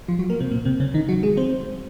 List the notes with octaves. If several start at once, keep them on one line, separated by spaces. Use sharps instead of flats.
F3 F4
F#3 F#4
A#3 A#4
C3 C4
A#2 A#3
C3 C4
C#3 C#4
D#3 D#4
F#3 F#4
G#3 G#4
C4 C5